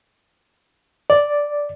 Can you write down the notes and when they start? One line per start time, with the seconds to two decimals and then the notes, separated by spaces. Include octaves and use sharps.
1.10 D5